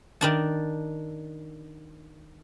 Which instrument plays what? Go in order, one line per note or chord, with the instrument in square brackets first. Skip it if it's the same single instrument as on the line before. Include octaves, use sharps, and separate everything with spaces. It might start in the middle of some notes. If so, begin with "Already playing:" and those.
[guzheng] D#3 D4 A5